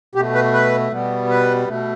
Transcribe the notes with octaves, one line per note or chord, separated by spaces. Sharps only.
B2 A3 G4
B4
B4
B2 G3 B3
B4
B2 A3